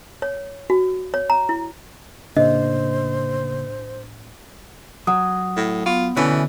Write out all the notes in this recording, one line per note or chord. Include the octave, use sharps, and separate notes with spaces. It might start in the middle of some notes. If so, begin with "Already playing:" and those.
C#5
F#4
C#5
A#5
E4
A2 C#3 A#3 D4 C5 D#5
F#3 F#5 D#6
A2
B3 F4 C#6
B2 D3 E3 A3 C#4